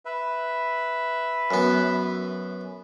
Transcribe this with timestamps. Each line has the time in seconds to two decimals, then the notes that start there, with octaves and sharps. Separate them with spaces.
0.05 B4 E5
1.51 F#2 B3